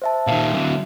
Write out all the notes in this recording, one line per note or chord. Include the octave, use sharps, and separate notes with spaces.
C5 E5 A5
A#2 D#3 E5 F5
D3 F#3